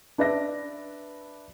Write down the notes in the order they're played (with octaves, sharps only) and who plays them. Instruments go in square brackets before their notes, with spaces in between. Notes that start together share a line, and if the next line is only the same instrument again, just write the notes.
[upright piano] D4 B4 D5 E5 A#6